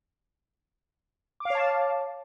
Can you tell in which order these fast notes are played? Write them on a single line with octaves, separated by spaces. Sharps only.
D6 F5 C#5 A5